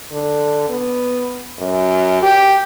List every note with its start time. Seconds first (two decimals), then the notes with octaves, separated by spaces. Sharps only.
0.11 D3
0.69 B3
1.59 F#2
2.22 G4